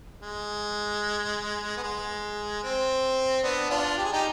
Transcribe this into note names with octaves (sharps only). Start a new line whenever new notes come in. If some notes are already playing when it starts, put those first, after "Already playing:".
G#3
B3
G#3
C4
B3 D4
D4 F4
G4
G#4
D#4 G4